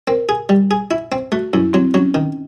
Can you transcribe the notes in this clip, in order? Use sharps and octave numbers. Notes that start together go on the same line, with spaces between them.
C4 A#4
G#4
G3
G#4
E4
C4
A3 F#4
F#2 E4
F#3 C4
F#3 C#4
D#3